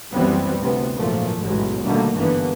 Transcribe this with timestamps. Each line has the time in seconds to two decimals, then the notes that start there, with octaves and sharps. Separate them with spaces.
0.12 F#1 C#2 E3 G3 B3 C4
0.59 A1 D2 C3 B3
0.95 G#1 F#2 A#2 E3 F3 A3
1.40 A1 E2 G#2 B2 F#3 G#3
1.84 B2 D3 D#3 G3 A3 A#3
2.15 G#1 G2 D3 E3 A#3 B3